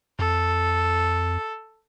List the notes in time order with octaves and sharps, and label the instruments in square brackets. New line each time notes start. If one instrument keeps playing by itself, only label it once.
[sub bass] F2 [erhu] A4